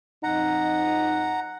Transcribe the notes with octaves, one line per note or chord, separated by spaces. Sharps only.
F2 D#4 F#5 A#5